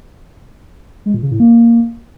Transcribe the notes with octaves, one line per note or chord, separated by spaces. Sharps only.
G#3
A#2
C#3
A2
A#3